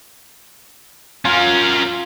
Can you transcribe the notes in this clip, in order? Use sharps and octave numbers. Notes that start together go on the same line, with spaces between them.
C#4 F4 A#4